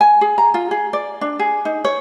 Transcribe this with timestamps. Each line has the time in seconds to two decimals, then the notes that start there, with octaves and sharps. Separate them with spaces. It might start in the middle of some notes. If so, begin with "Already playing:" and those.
0.01 G#5
0.21 G#4
0.38 A#5
0.54 F4
0.71 G#4
0.93 D5
1.21 D4
1.39 G#4
1.65 D#4
1.84 C#5